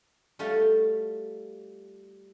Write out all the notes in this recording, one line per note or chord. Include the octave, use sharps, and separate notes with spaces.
G3 A3 F4 F#4